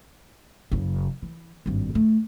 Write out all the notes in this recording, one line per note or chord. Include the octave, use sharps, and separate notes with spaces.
F#1 C#3
E3
G#1 G2
A3